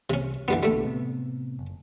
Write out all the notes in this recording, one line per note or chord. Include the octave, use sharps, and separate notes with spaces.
C2 C3 C#4
C2 F#2 D3 E3 G3 B3
B1 B2 D3 G3 A3
A2 C3 B3
F#1